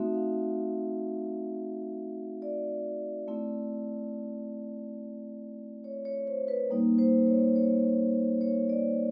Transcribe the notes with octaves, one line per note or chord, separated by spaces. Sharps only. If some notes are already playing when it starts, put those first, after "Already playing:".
Already playing: A3 C4 D#4 F#4 E5
F5
D5
A3 C4 E4
C#5
C#5
C5
B4
G3 A#3 D#4
C5
C#5
C#5
C#5
D5